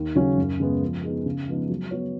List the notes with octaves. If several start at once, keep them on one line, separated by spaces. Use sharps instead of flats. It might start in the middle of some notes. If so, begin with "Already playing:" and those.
Already playing: D#2
C#3 F#3 C#4
F#2
C#3 G#3 B3
F3
B3 D#4 G#4
C#3
F3 G#3 B3 D#4
F#3
B3 F#4 C#5